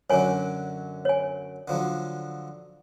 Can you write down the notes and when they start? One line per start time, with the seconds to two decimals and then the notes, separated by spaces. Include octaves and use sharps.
0.10 F#2 D3 F#3 C#5 G#5
1.05 C#5 G#5
1.68 D3 F3 F#3